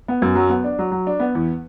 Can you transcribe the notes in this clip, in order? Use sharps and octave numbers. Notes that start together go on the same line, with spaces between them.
B3
F#2
F#3
B3
D4
F#3
F#3
D4
B3
E2